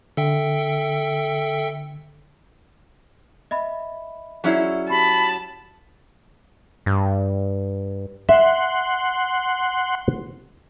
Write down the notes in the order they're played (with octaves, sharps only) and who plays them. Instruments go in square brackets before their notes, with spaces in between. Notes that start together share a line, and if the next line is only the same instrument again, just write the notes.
[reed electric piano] D3 [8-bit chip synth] A4 E5 G5
[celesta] D#5 E5 B5
[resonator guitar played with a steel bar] F#3 C#4 E4 [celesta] G#4 D5 C7
[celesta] G4 [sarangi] A5 [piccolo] B5
[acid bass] G2
[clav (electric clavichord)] E5 [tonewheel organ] F#5 C6